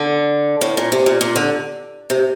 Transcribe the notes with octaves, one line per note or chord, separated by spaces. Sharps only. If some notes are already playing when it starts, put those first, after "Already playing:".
Already playing: D3
A2
A#2
C3
A#2
A#2
D3
C3